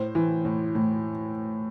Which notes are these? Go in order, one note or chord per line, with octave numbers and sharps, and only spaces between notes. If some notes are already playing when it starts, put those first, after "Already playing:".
Already playing: A2 C5
E3
A2
A2